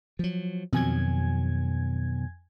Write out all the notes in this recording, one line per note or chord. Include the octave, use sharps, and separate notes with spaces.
F3 F#3
F2 B2 D#3 F#3 G#5 G#6